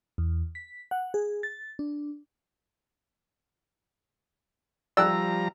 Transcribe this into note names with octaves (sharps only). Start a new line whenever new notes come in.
E2
B6
F#5
G#4
A6
D4
F3 G3 D5 G5 A#5 E6 F#6